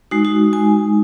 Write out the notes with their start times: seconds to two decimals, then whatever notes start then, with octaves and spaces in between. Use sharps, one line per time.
0.11 G#3 D#4 F#4
0.25 F#4
0.53 G#5